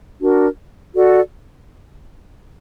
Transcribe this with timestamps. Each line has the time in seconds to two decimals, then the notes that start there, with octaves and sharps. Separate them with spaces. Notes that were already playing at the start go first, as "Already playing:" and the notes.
0.21 D4 F#4 A#4
0.94 F#4 A4 D5